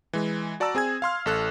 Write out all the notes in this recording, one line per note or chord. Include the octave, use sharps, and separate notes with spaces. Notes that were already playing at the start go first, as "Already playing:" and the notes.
E3 G#3
F#4 D5 A5 A#5 E6
C4 G#4 G#5 G#6
F5 C6 F6
A1 A4 F#6